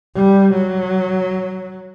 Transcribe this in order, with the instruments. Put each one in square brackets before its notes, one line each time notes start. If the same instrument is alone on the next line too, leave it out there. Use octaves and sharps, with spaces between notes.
[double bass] G3
F#3